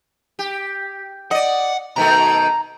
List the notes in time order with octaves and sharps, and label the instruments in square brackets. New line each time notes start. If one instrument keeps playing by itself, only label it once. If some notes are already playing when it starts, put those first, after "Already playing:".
[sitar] G4
[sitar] D5 D#5 [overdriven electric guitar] F#5
[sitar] B2 D#3 A3 [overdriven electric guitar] A#5